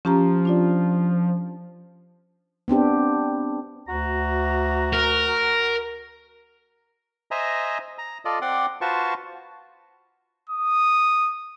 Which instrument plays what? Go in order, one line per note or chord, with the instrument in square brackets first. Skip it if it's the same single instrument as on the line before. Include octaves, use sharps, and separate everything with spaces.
[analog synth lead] F3 [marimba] C#4 G4 A#5
[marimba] D4 F4 D5
[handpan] B3 C4 D4 G4
[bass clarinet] D2 [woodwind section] F#4 A#5
[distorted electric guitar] A#4
[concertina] C5 D#5 E5 G#5 A#5
A#5
F4 A4 D5 D#5
C4 D5 F#5 C6 D6
F4 F#4 B4 C5 A5 C#6
[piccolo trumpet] D#6